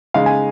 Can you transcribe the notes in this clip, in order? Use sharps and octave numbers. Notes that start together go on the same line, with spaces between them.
C#3 G#3 D#4 F5
G#5